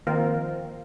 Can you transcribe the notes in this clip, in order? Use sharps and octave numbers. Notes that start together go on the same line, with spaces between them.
D#3 F3 A#3 C4 F4 A#4